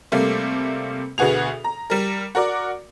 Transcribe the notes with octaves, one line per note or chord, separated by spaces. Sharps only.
C3 G3 A3 A#3
D2 B2 B3 F#4 G#4 F7
A#5
G3 A#4
F#4 A#4 D5 D6